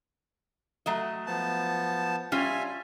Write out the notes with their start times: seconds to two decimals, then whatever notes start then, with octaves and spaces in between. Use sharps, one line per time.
0.86 F#3 A3 D#5
1.27 F3 B3 A5
2.32 G3 C#4 F4 E5 G#5